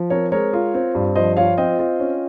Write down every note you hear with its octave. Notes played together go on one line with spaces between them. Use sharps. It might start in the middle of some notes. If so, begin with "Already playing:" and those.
Already playing: F3
C4 A#4 C#5
G#3 A#4 C#5
F4
C4
G2
F3 C5 D#5
F4 C#5 F5
C4 D#5 G5
F4
C#4